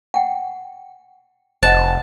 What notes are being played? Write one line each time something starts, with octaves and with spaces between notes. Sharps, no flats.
F#5 G5
F1 C5 D#5 F#5 A5